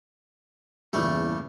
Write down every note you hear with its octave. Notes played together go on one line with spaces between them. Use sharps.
E2 G2 A#2 C#3 G3 A3 A4